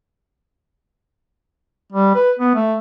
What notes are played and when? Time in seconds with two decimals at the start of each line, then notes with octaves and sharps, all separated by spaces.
1.92 G3
2.15 B4
2.39 B3
2.55 A3